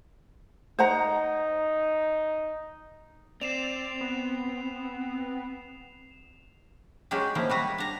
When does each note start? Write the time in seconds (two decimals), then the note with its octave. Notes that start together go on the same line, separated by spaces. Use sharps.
0.79 D#4 C5 F#5 A#5
3.41 C4 D5 C7 E7 F7
4.01 B3
7.11 F#3 G#3 C#4 G4 G#4
7.35 D#3 F3 A#3 E4
7.50 G3 F#4 B4 A#5
7.78 D4 A#5